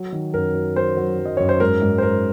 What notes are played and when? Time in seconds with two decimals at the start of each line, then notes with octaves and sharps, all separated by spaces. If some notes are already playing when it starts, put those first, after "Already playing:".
Already playing: F#3
0.12 D#3
0.34 F#2 A#4
0.55 F#3
0.75 F#3 C5
0.97 F#3
1.19 F#3
1.26 D#5
1.37 F#2 C#5
1.49 C5
1.60 G#2 A#4
1.82 G#2
1.98 C5
2.02 G#2 A#4